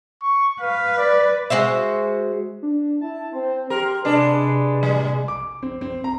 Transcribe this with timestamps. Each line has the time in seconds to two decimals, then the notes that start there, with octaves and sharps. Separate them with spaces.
0.22 C#6
0.61 B4 F5
0.98 D5
1.50 G#3 F#4 C5 E5
2.62 D4
3.01 E4 A5
3.33 C4 C5
3.70 G4 A#4 C6
4.05 C3 G#3 D4 B4
4.83 A2 G3 G#3
5.28 D6
5.63 C4
5.81 C4
6.04 A#5